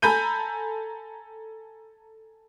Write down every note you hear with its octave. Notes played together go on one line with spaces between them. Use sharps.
A4 G#5 A#5 B5 G6 D#7